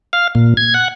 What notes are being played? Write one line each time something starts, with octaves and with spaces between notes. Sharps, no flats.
F5
A#2
G#6
F#5